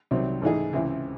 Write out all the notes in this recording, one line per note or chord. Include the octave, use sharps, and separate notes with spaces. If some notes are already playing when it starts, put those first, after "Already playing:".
C2 C3 D#3 F#3 C4
G#2 E3 A3 D#4 G#4
C#2 C3 E3 C4 E4